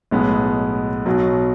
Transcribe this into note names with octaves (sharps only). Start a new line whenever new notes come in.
B1 A2 G#3 B3
B1 B2 F#3